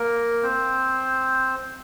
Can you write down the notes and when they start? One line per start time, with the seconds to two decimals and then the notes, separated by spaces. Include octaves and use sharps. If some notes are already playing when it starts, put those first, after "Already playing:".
Already playing: A#3 A#4
0.43 C4 C5